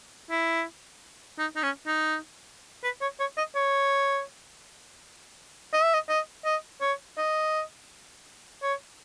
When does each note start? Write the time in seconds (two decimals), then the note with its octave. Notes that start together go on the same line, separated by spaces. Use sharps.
0.30 E4
1.39 D#4
1.56 D#4
1.63 C#4
1.87 D#4
2.84 B4
3.01 C#5
3.20 C#5
3.38 D#5
3.55 C#5
5.73 D#5
5.83 E5
5.94 D#5
6.09 D#5
6.45 D#5
6.81 C#5
7.18 D#5
8.62 C#5